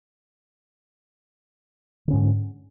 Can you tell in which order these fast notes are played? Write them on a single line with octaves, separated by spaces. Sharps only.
D3 C#4 G#2